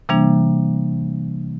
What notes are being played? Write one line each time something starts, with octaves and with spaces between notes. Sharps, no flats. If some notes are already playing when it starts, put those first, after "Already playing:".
C3 E3 G3 A#3 D4